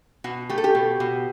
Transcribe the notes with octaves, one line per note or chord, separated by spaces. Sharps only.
B2 F#4
A3 G4
A4
G4
B2
B2